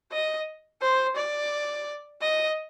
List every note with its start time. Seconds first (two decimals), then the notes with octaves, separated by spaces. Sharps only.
0.12 D#5
0.82 C5
1.17 D5
2.22 D#5